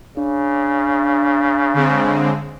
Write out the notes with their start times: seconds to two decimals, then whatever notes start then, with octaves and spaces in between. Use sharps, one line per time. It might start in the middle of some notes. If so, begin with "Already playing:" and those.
0.17 C#3 D4
1.74 D3 G#3 C4